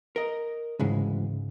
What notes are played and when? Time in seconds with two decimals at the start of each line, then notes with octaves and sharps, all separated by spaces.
0.16 A#4 D#5
0.79 D2 G#2 C#3 E3 G#3